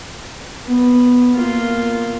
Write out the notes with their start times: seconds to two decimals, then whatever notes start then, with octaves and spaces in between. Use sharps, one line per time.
0.66 B3
1.35 A#3 F4